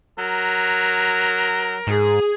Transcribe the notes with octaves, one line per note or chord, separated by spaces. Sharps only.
F#3 A#4
G#2 G#4